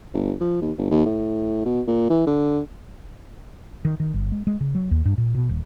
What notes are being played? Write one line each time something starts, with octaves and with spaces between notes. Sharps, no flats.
G1
F3
D#2
G1
D#2
A2
B2
A#2
E3
D3
D#3
D#3
G1
G#3
G#3
C#3
F#3
D#2
G2
A#2
B2
D#1